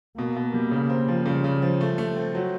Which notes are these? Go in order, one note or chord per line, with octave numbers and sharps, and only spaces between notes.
B2 A#3
B2
G3
C#3
C4
F3
C#3 G3
C#3
F3
A3
A3
C4
F#3